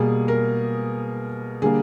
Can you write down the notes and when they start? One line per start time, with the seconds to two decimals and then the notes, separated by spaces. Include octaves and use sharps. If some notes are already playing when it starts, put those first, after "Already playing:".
Already playing: B2 G3 A#3 G#4
0.28 A#4
1.62 D3 G3 A#3 G#4